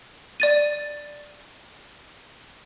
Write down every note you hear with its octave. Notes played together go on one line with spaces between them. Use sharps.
D5 A6 D#7